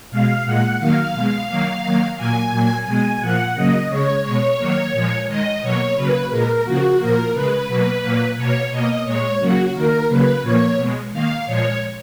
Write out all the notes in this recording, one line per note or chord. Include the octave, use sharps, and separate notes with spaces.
B2 G#3 F5
A#2 G#3 F#5
D#3 F#3 A#3 F5
B2 G#3
D#3 F#3 A#3
D#3 F#3 A#3
A#2 F#3 A#3 G#5
A#2 F#3 A#3
B2 G#3 G#5
A#2 F3 A#3 F#5
C#3 F#3 A#3 D#5
C#3 G#3 C#5
B2 G#3 C#5
D#3 F#3 A#3
A#2 F3 G#3
D#3 G#3 D#5
B2 F#3 A#3 C#5
C#3 F#3 A#3 B4
A#2 G#3 A#4
C#3 F3 A#3 F#4
A#2 F3 A#3 A#4
C#3 G#3 B4
B2 F#3 A#3
A#2 F#3 A#3
B2 A#3 C#5
B2 A#3 D#5
A#2 G#3 C#5
C#3 F#3 A#3 F#4
D#3 A#3 A#4
C#3 F#3 A#3 B4
A#2 F3 A#3 C#5
B2 G#3
D#3 A#3 F5
A#2 F3 G#3 C#5